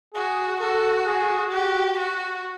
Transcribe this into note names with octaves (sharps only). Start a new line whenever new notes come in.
F#4 G#4
F#4 A4
G#4
F#4 G4
F#4